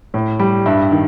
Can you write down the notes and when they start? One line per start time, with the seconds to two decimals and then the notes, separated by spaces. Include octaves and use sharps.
0.14 A2
0.39 G3
0.65 G2 E5
0.92 D#3